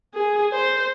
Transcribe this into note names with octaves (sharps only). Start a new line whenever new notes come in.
G#4
C5